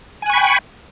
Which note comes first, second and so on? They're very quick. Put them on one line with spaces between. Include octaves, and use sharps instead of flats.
G#5 F#6 C#6 B5 G5